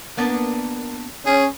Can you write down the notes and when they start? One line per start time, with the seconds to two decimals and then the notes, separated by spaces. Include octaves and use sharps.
0.17 A#3 B3 D4
1.26 C#4 G#4